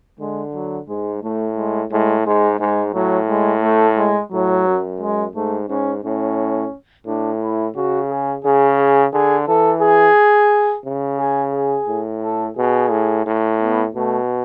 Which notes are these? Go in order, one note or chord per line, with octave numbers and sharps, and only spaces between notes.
D3 G#3
F#3
G#2 G#3
A2 A3
G#3
A2 G#3
G#2 G#3
G#2 G#3
A2 F#3
G#3
A3
G#3
A2 F#3
F#2
G#3
G#2 A3
G#2 C#4
A2 C#4
A2 D4
E4
C#3 F#4
G#4
C#3 G#4
G#4
D3 G#4
E3 A4
G#4
C#3
G#4
G#4
A2
A4
B2 G#4
A2
A2
B3
B2 A3